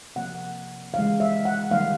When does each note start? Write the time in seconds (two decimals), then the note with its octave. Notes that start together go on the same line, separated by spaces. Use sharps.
0.16 C3 F3 A#3 F#5
0.94 C#3 E3 G#3 F5
1.20 E5
1.45 F#5
1.71 D#3 G3 A#3 F5